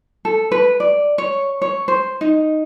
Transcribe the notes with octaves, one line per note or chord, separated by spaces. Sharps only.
A4
B4
D5
C#5
C#5
C5
D#4